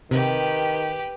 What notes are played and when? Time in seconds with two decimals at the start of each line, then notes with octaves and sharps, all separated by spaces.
0.11 C3 D#3 G4 B4